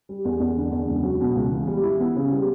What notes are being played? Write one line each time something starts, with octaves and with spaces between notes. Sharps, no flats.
G3
E2
E2
D3
E2
C#2
F#3
B2
C#2
E3
G3
E4
B3
C#3
G3